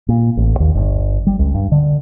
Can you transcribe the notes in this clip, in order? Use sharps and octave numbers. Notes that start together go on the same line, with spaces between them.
A#2
A1
D#2
G1
G3
C#2
G2
D3